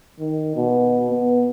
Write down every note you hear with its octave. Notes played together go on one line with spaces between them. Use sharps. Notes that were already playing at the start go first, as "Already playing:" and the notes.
D#3
B2
B3